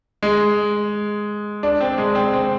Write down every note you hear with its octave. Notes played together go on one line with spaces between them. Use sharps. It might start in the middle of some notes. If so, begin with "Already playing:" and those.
G#3
D4
C4
G#3
C4
C4